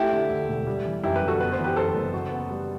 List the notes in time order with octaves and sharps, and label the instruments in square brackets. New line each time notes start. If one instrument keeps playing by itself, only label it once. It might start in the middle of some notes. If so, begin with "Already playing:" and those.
Already playing: [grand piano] A3 [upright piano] E4 G4
[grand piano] D3
D2
E1
G3
E3
[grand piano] F#2 [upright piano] E4 G4
[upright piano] G4 B4
[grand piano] G1
[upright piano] F#4 A4
[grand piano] B3 [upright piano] B4
[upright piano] C5
[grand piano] E3
[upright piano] G4 B4
[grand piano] F#2 [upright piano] A4 C5
[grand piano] F#1
F#4
B3
G3